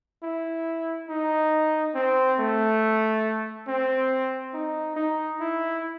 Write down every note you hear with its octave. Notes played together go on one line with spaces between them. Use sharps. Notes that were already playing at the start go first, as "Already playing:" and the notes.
E4
D#4
C4
A3
C4
D#4
D#4
E4